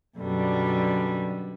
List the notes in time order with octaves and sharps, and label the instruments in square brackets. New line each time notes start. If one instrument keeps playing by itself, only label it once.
[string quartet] F#2 B2 D3 G3